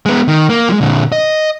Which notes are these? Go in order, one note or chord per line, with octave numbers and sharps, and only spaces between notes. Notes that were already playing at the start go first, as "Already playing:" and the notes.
G#3 B3
D#3
A#3
F3 G#3
A#2 D3
D#5